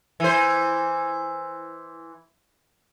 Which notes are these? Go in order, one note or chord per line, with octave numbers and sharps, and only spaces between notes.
E3 C5